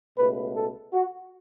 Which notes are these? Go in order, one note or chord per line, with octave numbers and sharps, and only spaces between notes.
C#2 B2 A3 B4
A4
F#4